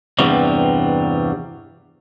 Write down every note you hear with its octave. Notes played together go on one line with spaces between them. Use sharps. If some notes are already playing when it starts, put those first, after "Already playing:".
E2 G2 C3 F#3 G3